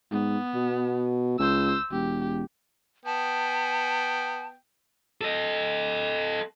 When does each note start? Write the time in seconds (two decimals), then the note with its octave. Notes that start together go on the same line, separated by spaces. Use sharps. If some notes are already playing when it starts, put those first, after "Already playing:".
0.12 G#2 B3
0.54 B2
1.39 C#2 C5 E6
1.92 E1 G4
3.06 B3 G5 A5
5.21 A4 D#5